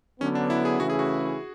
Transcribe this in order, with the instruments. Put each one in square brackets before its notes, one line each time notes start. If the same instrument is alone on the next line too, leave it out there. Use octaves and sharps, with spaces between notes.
[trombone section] D3 F#3 B3 [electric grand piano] C#4
[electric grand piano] D4
E4
G#4
[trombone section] C#3 E3 A3 C#4 E4 [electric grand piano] F#4
[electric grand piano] G#4
F#4